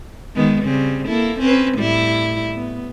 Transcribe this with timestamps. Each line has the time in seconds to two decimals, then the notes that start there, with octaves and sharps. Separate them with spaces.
0.35 D#3 G#3 B3
0.64 C#3 G3 C4
1.08 A#3 E4 A4
1.39 C4 C#4 B4
1.78 A2 G3 E4
2.54 B3